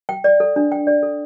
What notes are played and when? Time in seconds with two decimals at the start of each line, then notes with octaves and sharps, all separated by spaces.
0.09 G5
0.24 D5
0.40 A4
0.56 D4
0.72 G5
0.87 D5
1.03 A4